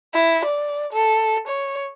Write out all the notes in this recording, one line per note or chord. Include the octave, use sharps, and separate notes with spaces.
E4
D5
A4
C#5